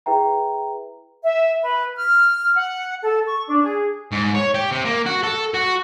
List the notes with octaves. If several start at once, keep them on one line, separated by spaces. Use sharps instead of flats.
E4 G#4 B4 E5 G5 A#5
E5
B4
F6
F#5
A4
C#6
D4
G#4
G#2
C#5
G4
C3
A#3
F#4
A4
F#4